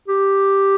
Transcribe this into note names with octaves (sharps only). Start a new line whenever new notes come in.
G4